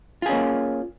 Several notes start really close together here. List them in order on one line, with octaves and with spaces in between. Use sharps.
F4 G#4 C#4 A#3